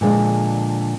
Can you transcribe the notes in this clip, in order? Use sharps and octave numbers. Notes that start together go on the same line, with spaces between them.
A#2 D3 F3 G#3 D4